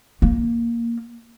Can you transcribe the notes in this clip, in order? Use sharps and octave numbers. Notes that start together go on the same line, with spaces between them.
A#3